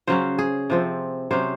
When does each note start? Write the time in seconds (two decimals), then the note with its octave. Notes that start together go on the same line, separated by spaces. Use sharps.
0.07 C#3 F#3 C#4 C5
0.39 G#4
0.70 C3 F3 C4
1.31 C3 F#3 C#4 C5